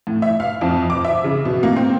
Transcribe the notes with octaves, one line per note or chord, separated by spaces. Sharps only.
A2
E5
F5
F2
D6
E5
C#3
B2
A#3
C4